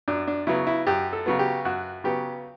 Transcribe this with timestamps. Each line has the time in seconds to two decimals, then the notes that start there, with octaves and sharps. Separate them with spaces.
0.08 F#2 D4
0.27 D4
0.47 C#3 F#3 B3 E4
0.67 E4
0.87 F#2 G4
1.13 A4
1.26 C#3 F#3 B3
1.39 G4
1.65 F#2 F#4
2.04 C#3 F#3 B3 G4